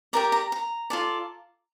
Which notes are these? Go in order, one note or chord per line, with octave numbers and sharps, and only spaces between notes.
G4 A#4 D5 A#5
A#5
A#5
F4 A4 D5